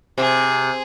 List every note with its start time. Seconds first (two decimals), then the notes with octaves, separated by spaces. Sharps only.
0.18 C3 G#4